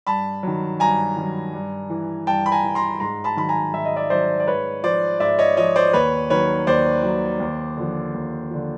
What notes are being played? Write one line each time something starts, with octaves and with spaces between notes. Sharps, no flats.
G2 A5 B5
D#3 F#3
G2 G#5 A#5
D#3 F#3
G2
E3
G2 G5 A5
B5
G#5 A#5
E3
A#5 C6
G#2 A#5 C6
A5 B5
D#3 F#3 B5
G#5 A#5
G#2 E5
D#5
D5 E5
D#3 F#3 C5 D5
D5
G#2 B4 C#5
F3 C5 D5
G#2 D5 E5
C#5 D#5
F3 C#5 D#5
C5 D5
D#2 B4 C#5
D#3 F#3 B4 C#5
D#2 C5 D5
D#3 F#3
D#2
D3 F3
D#2
D3 F3